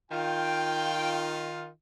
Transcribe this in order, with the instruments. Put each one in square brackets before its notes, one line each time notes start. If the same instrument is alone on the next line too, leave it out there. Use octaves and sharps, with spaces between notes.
[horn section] D#3 F4 [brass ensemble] G5